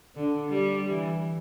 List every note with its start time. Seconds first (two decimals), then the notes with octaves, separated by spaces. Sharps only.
0.16 D3
0.49 G3
0.90 E3